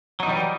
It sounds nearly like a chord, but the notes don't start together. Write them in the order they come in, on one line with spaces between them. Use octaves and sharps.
F#3 D#4 E3 G3